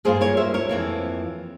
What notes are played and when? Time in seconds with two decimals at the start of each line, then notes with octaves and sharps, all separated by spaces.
0.05 G2 G3 A#3 F4 G#4 C5
0.21 A#4 C#5
0.37 C5 E5
0.54 A#4 C#5
0.69 F2 E3 A#3